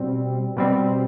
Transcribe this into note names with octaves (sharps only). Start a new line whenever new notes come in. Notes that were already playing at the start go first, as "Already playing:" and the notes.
Already playing: B2 G3 C4
B2 G3 C4